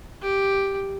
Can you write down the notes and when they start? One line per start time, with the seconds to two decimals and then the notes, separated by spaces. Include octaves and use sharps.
0.22 G4